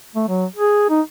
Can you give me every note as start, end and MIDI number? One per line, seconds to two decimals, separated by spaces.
0.16 0.26 57
0.29 0.45 54
0.56 0.86 68
0.90 1.01 63